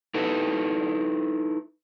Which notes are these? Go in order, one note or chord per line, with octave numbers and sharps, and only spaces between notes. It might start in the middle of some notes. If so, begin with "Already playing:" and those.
D#4 E4 A4 B4